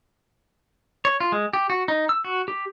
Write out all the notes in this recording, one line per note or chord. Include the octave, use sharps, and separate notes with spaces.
C#5
F4
G#3
G4
F#4
D#4
E6
F#4
G4